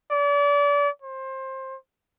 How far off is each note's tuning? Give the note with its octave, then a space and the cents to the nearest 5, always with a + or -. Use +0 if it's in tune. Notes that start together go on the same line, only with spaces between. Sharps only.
D5 -35
C5 +20